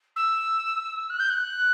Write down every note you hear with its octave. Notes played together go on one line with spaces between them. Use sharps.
E6
F#6
G6
F#6